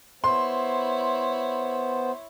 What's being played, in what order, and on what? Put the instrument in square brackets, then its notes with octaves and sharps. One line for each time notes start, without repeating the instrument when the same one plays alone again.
[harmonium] B3 C5 [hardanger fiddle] E4 C#5 [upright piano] C6